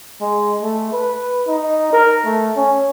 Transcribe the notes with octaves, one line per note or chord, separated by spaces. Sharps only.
G#3
A3
B4
D#4
A#4
A3
C#4